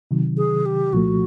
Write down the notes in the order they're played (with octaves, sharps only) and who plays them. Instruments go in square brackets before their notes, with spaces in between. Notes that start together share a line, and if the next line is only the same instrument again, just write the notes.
[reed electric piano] C3 D#3 F#3
[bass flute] G#4
G4
[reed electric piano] C2 A#2 F3 A3 [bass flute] F#4